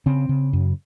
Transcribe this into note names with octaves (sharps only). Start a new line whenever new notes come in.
C#3 C4
C#3
F#2